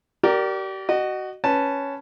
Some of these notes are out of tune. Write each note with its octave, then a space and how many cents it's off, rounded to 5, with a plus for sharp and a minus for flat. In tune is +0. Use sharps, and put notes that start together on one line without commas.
G4 -35 A#4 +0 D5 +0
F#4 +20 D#5 -25
C#4 +0 B4 +0 A5 +0